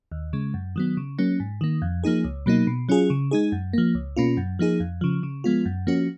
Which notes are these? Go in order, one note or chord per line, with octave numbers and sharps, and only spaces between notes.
D#2
C#3 G#3
F#2
D#3 F#3 B3
C#3
F#3 A#3 C#4
G#2
D#3 A#3
F2
F3 A#3 D#4 G#4
C#2
B2 F#3 A#3 D#4
B2
F#3 C#4 F4 G#4
C#3
G#3 D#4 G#4
F#2
F3 A#3
C#2
B2 A#3 C#4 F4
F#2
F3 A#3 D#4 G#4
F2
C#3 F3
C#3
F3 G#3 B3 F4
F#2
F3 A#3 C#4 F#4